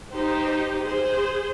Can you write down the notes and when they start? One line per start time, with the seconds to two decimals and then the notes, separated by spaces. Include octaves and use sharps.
0.12 D#4 G4 C5
0.83 G#4 C5